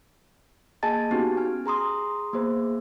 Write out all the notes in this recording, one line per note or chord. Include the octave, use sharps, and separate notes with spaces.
A#3 G#4 D#5 G#5 A5 A6
B3 C#4 D#4 F#4 G4
G#5 F6
G#4 A#5 C6 D#6
A#3 B3 G#4 C5